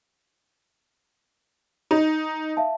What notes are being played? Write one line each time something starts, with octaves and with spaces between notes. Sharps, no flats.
D#4
E5 F5 A5